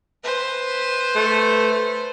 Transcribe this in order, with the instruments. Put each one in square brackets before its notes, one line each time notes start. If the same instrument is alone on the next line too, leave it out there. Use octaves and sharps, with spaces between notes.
[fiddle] B4 C5
[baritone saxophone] A3